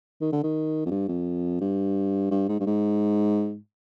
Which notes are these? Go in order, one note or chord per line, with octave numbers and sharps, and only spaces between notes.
D#3
D3
D#3
F2
G2
F2
G2
G2
G#2
G2
G#2